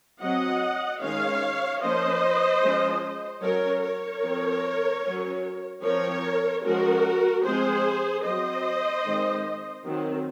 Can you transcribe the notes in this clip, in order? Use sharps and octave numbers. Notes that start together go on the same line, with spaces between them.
F#3 C4 D#5 F#5
D#3 G#3 C#4 C#5 F5
F3 A#3 C#4 C5 D#5
F3 G#3 C#4
F#3 C#4 A#4 C#5
A#4 C#5
F3 C4
F#3 C#4
F3 C4 A#4 C#5
F3 G#3 C#4 F#4 A#4
F3 G#3 C4 G#4 C5
F#3 C4 C5 D#5
D#3 G#3 C4
D#3 F#3 C4